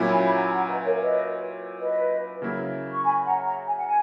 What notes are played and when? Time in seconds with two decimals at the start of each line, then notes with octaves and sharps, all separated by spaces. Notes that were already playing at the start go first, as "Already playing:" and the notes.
Already playing: A#2 F#3 C#4 E4
0.11 G#5 B5
0.25 B5
0.32 F#5 A#5
0.47 G#5
0.53 F#5 A#5
0.69 B4 D#5
0.84 A#4 C#5
0.95 E5
1.00 B4 D#5
1.79 B4 D#5
2.42 C#3 F#3 A#3 E4
2.92 C#6
3.04 G#5 B5
3.25 F#5 A#5
3.46 F#5 A#5
3.67 G#5
3.77 F#5
3.87 G#5